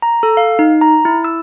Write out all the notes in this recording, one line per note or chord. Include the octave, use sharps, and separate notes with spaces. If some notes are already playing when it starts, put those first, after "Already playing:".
A#5
A4
F5
D#4
A#5
E4
E6